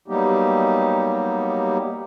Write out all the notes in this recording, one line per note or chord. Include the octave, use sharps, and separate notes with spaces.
F#3 G3 A#3 B3 D#4 G4